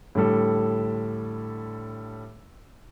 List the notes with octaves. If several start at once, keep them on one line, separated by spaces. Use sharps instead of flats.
A2 D3 G3 A4